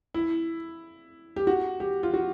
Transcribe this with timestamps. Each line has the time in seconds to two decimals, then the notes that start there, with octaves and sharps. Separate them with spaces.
0.14 E4
1.36 G4
1.47 F#4
1.80 G4
2.03 F4
2.14 F#4